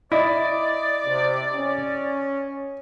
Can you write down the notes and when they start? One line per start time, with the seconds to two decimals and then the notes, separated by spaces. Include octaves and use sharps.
0.12 E4 D5 D#5
1.06 C3
1.53 C#4